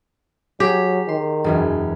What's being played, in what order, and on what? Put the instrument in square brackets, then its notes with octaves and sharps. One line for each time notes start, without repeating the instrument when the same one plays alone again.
[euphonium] F#3 [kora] G4 [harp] G#4
[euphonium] D#3 [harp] C6
[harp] E1 F#2 E3